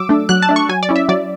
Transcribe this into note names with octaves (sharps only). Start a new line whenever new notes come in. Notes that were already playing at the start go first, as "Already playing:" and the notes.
Already playing: F#3 D6 E6
A3 D4
F#3 F#6
A5
A3 D4
C#6
F#3 G#5
D5
C#4 E4
E5
F#3 D5